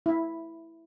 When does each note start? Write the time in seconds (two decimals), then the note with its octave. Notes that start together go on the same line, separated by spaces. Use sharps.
0.06 E4